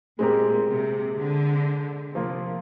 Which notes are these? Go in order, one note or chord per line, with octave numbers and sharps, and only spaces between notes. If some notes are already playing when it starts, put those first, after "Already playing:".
A#2 G#3 C4 G4 A#4
C3
D3
C3 F3 A#3 F4